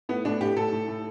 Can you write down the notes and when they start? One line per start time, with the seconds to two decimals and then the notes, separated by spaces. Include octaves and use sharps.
0.09 A2 B3
0.25 A2 D4
0.41 A2 G4
0.56 A2 A4
0.72 A2
0.88 A2